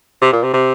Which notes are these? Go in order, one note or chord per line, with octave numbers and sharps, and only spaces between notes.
C3
A#2
C3
C3